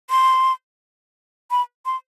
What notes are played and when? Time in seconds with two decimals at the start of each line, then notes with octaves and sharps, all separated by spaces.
0.10 C6
1.51 B5
1.86 C6